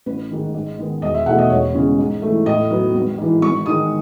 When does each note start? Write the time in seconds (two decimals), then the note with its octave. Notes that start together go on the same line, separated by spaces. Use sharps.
0.06 A1 B4
0.30 G#2 D#3
0.54 G#2
0.78 D#3 G#3 B3
1.02 E1 D#5
1.14 E5
1.26 E2 B2 A3 D#4 F#5
1.38 D#5
1.50 E1 C#5
1.74 E2 C#3 G#3 C#4
1.98 G#2
2.22 E3 A3
2.46 A2 D#5
2.70 F#3 B3 D#4
2.95 G#1
3.18 G#2 E3
3.42 G#1 C#6
3.66 G#2 D#3 G#3 D#4 D#6